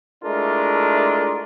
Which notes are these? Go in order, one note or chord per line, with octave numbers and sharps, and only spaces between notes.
G#3 A3 D4 E4 F4 A#4